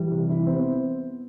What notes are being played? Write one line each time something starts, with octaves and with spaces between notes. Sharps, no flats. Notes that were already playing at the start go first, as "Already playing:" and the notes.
Already playing: E3 G3
C3
E4
B3 C4